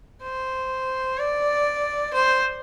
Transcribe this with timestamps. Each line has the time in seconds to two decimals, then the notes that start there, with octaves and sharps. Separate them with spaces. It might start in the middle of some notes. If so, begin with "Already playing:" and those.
0.24 C5
1.19 D5
2.14 C5